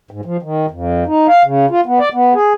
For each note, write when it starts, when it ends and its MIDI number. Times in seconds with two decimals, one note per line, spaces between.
0.11 0.21 44
0.25 0.37 53
0.43 0.66 51
0.71 1.04 41
1.06 1.27 63
1.28 1.43 77
1.45 1.66 49
1.70 1.81 65
1.86 1.99 59
1.99 2.09 74
2.14 2.34 59
2.34 2.53 68